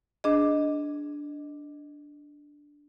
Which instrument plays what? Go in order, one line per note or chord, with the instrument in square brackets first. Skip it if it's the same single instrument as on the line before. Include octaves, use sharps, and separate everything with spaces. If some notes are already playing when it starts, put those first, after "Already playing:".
[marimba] D4 G#4 D#5